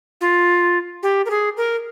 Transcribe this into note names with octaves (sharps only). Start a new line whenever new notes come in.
F4
G4
A#4
G#4
A#4